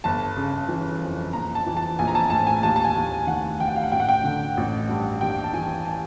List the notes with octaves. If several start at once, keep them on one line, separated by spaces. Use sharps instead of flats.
G1 A5
C#3
E3
F2
A#1 A#5
A5
E3
A5
A#1 G#5
A#5
A5
A2 A5
G#5
D#2 A5
A5
G#5
D#2
D#3 F#5
D#3 G5
F#5
F5
F#5
A1 G5
F#5
G5
D3
A1
G2
D#2 G5
A5
E3 G#5
A5